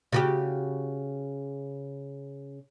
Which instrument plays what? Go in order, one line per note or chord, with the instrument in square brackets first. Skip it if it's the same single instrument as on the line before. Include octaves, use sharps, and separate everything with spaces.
[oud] C#3 F#4 G4